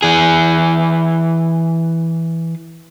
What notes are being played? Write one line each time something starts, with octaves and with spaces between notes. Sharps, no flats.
E3 G#4